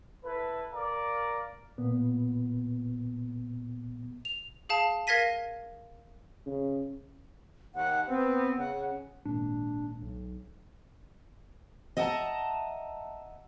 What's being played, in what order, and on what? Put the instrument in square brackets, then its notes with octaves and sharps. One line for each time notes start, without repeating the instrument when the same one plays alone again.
[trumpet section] E4 A4 B4
A#4 D5 F5 A#5
[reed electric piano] A#2 B3
[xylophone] F7
G#4 F5 A5
A#4 F5 G#6 A#6 B6 D#7
[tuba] C#3
[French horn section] D#2 [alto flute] F#5
[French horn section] B3 [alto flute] C4
[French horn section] C#3 [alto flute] F#5
[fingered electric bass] G#1 A#2 [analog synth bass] D4
[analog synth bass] B1
[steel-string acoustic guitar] D#5 E5 F#5 G5 A5 A#5